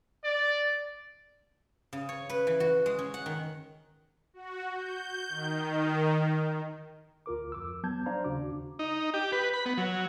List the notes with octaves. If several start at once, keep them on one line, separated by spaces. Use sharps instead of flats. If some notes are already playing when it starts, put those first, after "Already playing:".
D5
C#3
C#5
B4
E3
F#4
G#3
C#4
F#5
D#3
F#4
G6
D#3
D2 F4 A#4 D6
F2 D6 E6
F#3 B3 A5 G6 G#6
D4 C5 D5 F5 A#5
D#2 C#3 D4 F#4 D6
D#4
G4
B4
B5
B3
F#3